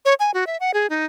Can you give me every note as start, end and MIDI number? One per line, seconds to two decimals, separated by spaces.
0.05 0.14 73
0.20 0.31 80
0.34 0.47 66
0.47 0.57 76
0.60 0.71 78
0.74 0.87 68
0.90 1.05 63